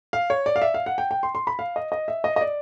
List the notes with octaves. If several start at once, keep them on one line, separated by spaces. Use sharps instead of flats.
F5
C#5
D5
F5
E5
F5
F#5
G5
G5
C6
C6
B5
F5
D#5
D#5
E5
D#5
D#5
D5